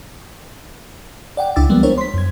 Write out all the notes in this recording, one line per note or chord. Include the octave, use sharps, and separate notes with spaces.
D5 F#5 G5
C#2 D4 E4 D6 E6 A6
F3 G3 G#3 A#3 B3
D4 E4 A#4 C5 C#5
C6 B6
F#2 G#6